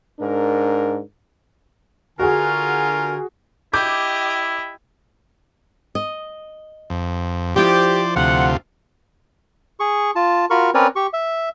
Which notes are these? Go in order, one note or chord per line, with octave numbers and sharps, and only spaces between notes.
G#2 D4 A#4
D3 F4 F#4 G#4 A#4 G#5
E4 G4 D#5 D6 G6
D#5
F2
F3 E4 G4 C5 D5
D2 C3 F4 F#5
G#4 C#6
F4 A5
F4 F#4 A#4 B5 C#6
C4 C#4 A#4 B4 C#5 D5
G4 C#6
E5